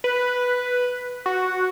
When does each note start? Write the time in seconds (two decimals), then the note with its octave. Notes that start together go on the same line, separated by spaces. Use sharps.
0.04 B4
1.26 F#4